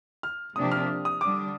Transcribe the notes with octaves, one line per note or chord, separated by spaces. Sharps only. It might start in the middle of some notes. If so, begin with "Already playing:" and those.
F6
C3 F3 A#3 D4 G4 D#6
F6
D#6
D3 G3 D4 D6